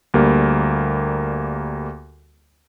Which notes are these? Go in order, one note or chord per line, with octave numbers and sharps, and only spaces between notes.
D2 G3 A#3